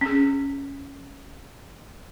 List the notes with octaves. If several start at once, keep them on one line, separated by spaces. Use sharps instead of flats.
C#4 G#4